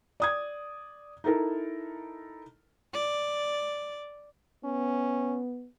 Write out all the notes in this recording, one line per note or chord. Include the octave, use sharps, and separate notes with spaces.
D5 D#6 G#6
D#4 E4 A4 A#4
D5
B3 C#4